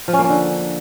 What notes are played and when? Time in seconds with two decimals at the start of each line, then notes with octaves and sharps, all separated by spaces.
0.08 F3
0.13 C#4
0.19 A#3
0.24 C#4
0.29 D3